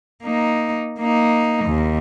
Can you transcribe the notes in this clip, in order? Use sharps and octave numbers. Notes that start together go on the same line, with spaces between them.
A#3 D#4
A#3 D#4
D#2